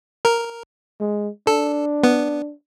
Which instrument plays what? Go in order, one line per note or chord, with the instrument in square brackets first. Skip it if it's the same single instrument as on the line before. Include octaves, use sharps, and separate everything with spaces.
[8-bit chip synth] A#4
[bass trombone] G#3
[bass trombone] D4 [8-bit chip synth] A4
[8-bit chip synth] B3